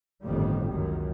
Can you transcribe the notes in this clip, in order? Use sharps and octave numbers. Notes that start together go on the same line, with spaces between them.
G1 F2 A2 D#3 G3
C#2 F#2 D#3